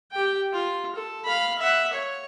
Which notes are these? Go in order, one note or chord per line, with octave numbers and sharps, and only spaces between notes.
G4 G5
F4
A4
F5 B5
E5 F#5
C#5